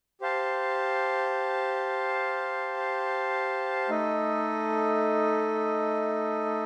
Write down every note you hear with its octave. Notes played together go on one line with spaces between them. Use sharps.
G4 C5 F5 A5
A3 D#4 A4 D#5